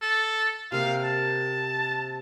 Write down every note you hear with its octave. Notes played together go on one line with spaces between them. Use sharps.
A4
C3 A#3 F5
A5